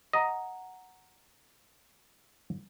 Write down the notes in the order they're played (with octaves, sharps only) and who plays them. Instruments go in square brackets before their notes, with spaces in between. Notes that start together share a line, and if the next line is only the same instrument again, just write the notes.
[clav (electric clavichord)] D#5 [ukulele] F#5 A#5